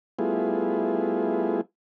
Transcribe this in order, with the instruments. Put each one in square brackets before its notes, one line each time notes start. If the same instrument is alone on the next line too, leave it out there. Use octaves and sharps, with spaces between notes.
[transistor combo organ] G3 A3 B3 E4 F4 G#4